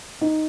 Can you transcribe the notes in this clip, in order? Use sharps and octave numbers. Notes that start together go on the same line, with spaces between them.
D#4